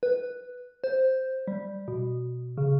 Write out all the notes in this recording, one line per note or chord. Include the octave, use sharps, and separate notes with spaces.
B4
C5
G3
B2
C#3